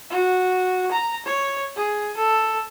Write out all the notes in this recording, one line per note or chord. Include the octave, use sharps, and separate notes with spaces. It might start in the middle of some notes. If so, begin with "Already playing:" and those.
F#4
A#5
C#5
G#4
A4